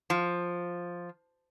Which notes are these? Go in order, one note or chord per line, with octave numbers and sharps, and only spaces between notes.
F3